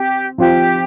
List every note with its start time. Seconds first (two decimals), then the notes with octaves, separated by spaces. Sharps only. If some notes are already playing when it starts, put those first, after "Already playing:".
Already playing: C4 G4
0.38 F3 C4 F4 G4 C5